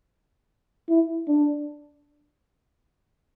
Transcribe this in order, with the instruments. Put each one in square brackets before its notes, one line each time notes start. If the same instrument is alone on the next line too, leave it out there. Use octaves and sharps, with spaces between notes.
[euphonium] E4
D4